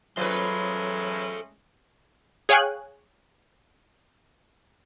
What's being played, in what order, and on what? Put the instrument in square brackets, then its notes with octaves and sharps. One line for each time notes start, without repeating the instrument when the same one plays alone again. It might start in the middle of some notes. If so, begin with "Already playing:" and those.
[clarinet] F#3 [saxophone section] G#3 A3 C#4 [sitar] F4 B4 [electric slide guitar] A4 C5
[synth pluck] G#4 C#5 F5 G5 G#5 F#6